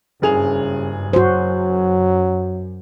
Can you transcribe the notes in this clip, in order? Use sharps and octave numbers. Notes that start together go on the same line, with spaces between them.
F#1 G2 C#3 G#4 F7
F#2 F#3 F#4 C5